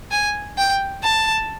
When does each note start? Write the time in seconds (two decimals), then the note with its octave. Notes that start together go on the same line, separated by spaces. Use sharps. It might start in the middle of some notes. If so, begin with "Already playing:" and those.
0.11 G#5
0.58 G5
1.03 A5